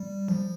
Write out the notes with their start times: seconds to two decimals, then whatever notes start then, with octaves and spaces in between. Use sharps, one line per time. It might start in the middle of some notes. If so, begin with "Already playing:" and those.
Already playing: G3
0.28 F3